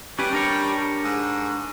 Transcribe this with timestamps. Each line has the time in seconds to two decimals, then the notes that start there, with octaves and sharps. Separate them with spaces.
0.19 G3 C#4 B4
0.33 D4 A#4 C#5
1.04 G#2